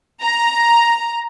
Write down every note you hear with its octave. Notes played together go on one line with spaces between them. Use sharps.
A#5